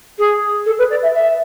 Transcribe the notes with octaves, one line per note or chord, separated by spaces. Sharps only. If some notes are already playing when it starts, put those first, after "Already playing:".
G#4
A4
B4
D5
E5
E5